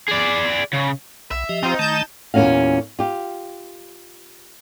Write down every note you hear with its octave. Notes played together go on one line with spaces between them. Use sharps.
G#4 D5
C#3
B1 E5
F3 G4 D#5
C4 D#4 F4
D#3 A3 A5 G6 E7
E2 A#2 D3 C#4 F#4 F5
F4 G4